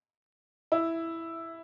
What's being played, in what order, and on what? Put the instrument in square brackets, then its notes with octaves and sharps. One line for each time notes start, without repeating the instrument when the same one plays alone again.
[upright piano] E4